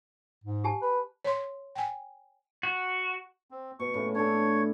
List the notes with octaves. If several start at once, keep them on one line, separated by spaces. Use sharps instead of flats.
G#2
G4 G#5 A5
B4
C#5 C6
G5 G#5
F#4
C4
B2 C#6
A2 C#3 A3
D4 A4 C#5